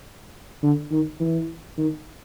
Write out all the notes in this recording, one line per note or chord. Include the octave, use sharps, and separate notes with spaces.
D3
D#3
E3
D#3